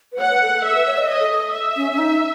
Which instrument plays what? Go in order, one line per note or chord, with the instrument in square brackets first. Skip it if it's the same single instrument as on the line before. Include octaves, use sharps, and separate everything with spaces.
[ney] B4
[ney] C#5 [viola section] F#5
[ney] B4
A4
A4
[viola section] E5
[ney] A4
B4
C#5
D#5
[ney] C#5 [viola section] D#5
[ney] A4
A4
[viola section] E5
[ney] C#4
C#4
D#4